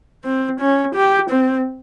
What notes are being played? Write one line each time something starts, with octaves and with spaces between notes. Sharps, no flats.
C4
C#4
G4
C4